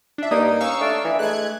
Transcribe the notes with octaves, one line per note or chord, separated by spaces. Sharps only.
D4 E5
G2 A#3 D#4 D5 A#5 D#6
C#4 F5 C#6 E6
A3 D4
E3
G#3 A3 F#6 G#6